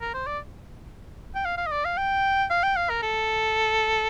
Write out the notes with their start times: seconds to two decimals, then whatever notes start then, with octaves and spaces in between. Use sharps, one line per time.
0.01 A#4
0.14 C5
0.27 D5
1.35 G5
1.45 F5
1.58 F5
1.66 D#5
1.71 D5
1.85 F5
1.97 G5
2.50 F5
2.63 G5
2.76 F5
2.89 A#4
3.02 A4